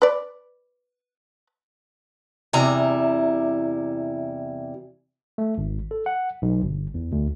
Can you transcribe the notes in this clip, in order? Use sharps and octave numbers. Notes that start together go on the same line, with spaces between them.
B4 D5
E2 C3 G3 E4 A#5
A3
G#1
A4
F#5
B1
G1
E2
D2